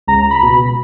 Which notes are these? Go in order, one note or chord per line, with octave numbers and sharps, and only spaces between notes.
C#2 A#5
B5
B2